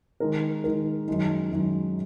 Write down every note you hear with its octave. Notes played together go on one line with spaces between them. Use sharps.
D#3 G#3 D#4 A#4
D#3 G#3 D#4 A#4
F#2 D#3 G#3 D#4
F#2 D#3 G#3 D#4